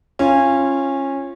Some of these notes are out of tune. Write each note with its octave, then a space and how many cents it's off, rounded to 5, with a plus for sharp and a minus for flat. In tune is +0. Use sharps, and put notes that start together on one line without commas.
C#4 -20 F4 -20